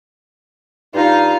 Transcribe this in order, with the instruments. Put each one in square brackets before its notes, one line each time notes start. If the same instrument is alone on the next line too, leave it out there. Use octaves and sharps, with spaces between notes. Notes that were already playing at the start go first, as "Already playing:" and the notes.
[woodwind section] G2 D#4 [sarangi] F4